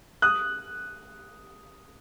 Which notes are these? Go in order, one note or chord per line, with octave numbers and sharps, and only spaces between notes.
D#6 F#6